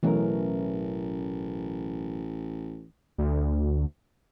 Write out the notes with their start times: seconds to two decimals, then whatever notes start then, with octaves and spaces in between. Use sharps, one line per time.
0.03 A1 B2 E3 F#3 A3 C#4 A#4
3.18 D2